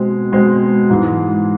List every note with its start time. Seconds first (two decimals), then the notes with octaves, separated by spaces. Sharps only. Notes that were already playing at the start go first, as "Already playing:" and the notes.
Already playing: B2 G#3 C4
0.32 B2 G#3 C4
0.90 G#2 E3 G#3